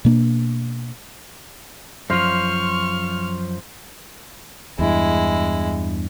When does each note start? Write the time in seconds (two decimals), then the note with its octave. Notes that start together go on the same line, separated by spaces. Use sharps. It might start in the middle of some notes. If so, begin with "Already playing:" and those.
0.05 B2 A#3 D4
2.10 F#2 F3 C5 F5 C6 C#6 F6
4.79 E2 G2 G#3 E4